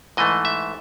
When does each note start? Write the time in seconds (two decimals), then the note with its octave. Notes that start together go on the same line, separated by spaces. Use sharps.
0.17 G#2 E3 A3 D#5
0.45 E5